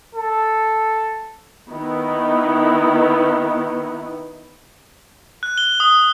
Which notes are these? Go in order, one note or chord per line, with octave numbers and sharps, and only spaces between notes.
A4
D#3 B3 D#4 E4
F#6
G7
D#6